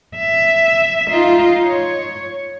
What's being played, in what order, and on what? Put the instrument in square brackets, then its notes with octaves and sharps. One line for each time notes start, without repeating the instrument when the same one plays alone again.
[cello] E5
D#4 F4
C#5